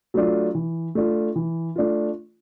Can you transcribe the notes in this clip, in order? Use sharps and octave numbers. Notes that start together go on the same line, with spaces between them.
F#3 A3 D4 F4
E3
A3 D4 F4
E3
A3 D4 F4